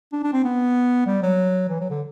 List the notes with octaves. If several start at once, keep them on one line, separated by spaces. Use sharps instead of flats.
D4
D4
C4
B3
G3
F#3
E3
F#3
D3